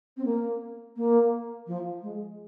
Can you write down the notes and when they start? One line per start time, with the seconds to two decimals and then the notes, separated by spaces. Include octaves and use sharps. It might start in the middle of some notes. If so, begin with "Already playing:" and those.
0.17 C4
0.25 A#3
0.96 A#3
1.67 F3
2.02 G#3